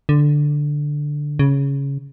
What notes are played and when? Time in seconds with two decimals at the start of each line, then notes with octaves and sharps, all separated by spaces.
0.09 D3
1.39 C#3